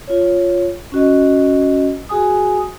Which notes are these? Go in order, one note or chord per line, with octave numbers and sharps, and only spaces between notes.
F4 C#5
C#4 F#4 D#5
F#4 G#4 G#5 D#6